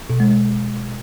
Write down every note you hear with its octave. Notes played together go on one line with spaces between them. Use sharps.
B2
G#3
G#3